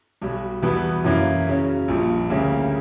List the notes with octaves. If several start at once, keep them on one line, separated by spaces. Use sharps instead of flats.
B1 B2 G3
E2 B2 G3 B3
F#2 E3 A#3
C#3 F#3 C#4
A#1 A#2 G3
D2 C#3 G3 A#3